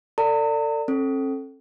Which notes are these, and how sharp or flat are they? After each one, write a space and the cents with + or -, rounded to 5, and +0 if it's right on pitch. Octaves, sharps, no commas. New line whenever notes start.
A4 +35 D5 +0 A#5 -45
C4 +45 A4 +0